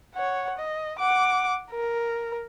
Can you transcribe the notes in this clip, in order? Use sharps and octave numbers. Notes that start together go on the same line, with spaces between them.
C#5 F#5
D#5
F#5 D6
A#4